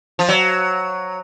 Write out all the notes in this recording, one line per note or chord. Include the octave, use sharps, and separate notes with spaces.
F3
F#3